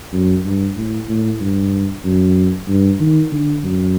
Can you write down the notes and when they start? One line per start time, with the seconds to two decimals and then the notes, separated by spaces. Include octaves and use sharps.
0.13 F#2
0.45 G2
0.76 A2
1.09 A2
1.41 G2
2.05 F#2
2.68 G2
3.00 D#3
3.32 D3
3.64 F#2